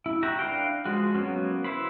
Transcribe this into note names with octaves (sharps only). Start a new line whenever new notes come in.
E4
F#4 G4 E5 A#5
D4 B4 F5 G5
F3 G#3 F#4
F#3 A#3 B3 C#4
E4 B4 C5 B5